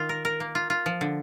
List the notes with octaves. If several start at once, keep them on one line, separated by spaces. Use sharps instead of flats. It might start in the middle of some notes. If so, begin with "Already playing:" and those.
Already playing: D#3 F4
A#4
A#4
A#3
F4
F4
F3
D3